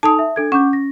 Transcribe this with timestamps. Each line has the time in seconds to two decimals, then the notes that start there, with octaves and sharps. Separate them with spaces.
0.03 D#4 A4 A5 D#6 F7
0.19 E5
0.36 D4 A4 G#6
0.52 C#4 F#5 D6 G6
0.73 A#6